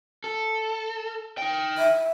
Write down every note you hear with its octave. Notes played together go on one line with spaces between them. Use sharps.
A4
D#4 G5
E5